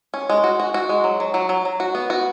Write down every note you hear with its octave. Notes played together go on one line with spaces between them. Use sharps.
C#4
G#3
F#4
F#4
F#4
G#3
F#3
F#3
F#3
F#3
F#3
F#4
B3
F#4